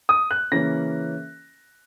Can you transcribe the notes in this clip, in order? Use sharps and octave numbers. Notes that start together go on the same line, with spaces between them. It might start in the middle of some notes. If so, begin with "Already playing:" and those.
D#6
F#6
C#3 E3 A#3 C#4 A#6